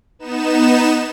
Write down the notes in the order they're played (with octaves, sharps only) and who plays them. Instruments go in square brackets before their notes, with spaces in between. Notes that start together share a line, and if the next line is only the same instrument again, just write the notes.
[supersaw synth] B3 D#4 E7